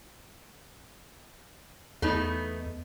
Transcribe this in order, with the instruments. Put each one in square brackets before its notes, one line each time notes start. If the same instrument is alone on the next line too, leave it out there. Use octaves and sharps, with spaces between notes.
[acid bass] E2 [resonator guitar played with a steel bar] A3 B3 D#4